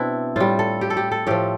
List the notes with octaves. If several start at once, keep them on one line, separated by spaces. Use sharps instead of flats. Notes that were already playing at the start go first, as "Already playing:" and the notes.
Already playing: B2 C4 D4 E4
A2 G3 F4
A4
G4
A4
G4
A4
A2 F3 G4